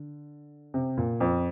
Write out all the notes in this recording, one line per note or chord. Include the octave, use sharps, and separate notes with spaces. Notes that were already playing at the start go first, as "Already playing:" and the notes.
Already playing: D3
C3
A#2
F2